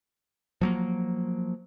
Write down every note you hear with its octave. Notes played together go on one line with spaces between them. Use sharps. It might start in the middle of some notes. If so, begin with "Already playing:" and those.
F3 F#3 A#3